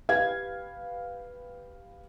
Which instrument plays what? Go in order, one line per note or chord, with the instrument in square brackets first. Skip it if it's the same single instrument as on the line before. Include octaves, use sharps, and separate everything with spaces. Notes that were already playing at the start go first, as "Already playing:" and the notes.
[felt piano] G4 B4 F5 G#6